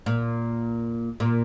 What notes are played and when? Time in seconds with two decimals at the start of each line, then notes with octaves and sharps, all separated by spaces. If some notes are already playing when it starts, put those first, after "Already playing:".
0.06 A#2
1.20 A#2